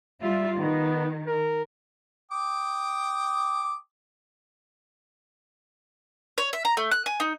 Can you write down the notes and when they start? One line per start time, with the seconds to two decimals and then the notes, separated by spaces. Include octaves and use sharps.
0.22 G3 F4 E5
0.58 D#3 B3
1.27 A#4
2.31 G5 D6 D#6
6.38 C#5
6.53 E5
6.65 A#5
6.77 A3
6.91 F#6
7.06 G#5
7.20 D#4